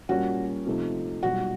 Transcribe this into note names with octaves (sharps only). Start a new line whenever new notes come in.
A#2 G3 A#3 C#4 F#4
C3 F3 A3 C4 D#4
B1 A#2 G3 F#4